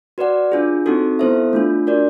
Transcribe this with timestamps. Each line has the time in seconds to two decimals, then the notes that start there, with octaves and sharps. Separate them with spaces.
0.18 F#4 B4 D5 F#5
0.52 D4 F4 G#4
0.86 C4 D#4 F#4 A4
1.19 B3 E4 A4 C5 E5
1.53 A3 D4 F4
1.87 D4 F#4 A#4 D5